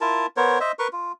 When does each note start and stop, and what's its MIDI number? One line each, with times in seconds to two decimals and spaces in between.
0.01 0.26 64
0.01 0.26 65
0.01 0.26 70
0.01 0.26 81
0.37 0.59 59
0.37 0.59 70
0.37 0.59 72
0.37 0.59 73
0.60 0.72 72
0.60 0.72 75
0.60 0.72 76
0.79 0.88 70
0.79 0.88 71
0.79 0.88 85
0.93 1.12 65